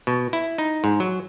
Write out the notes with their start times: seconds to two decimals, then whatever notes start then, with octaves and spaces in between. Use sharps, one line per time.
0.07 B2
0.33 E4
0.58 D#4
0.84 G#2
1.00 F#3